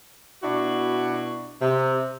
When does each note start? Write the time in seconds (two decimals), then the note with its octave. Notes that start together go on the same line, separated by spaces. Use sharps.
0.43 B2 D4 E4 F#4
1.61 C3